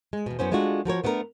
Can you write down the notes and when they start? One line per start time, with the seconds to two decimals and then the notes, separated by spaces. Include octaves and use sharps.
0.13 G#3
0.26 E2 B2
0.39 F#2 B3 C#4 C5
0.52 G#3 A3 D4 F4 F#4
0.85 F3 F#4 A#4 C#5
1.04 A3 B3 D4 E4 A#4